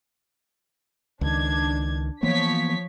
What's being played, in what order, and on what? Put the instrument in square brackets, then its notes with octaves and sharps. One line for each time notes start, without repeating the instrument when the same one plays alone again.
[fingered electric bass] C#2 D#3 [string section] D4 G#6
[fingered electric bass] E3 A#3 B3 [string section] F3 C#5 B6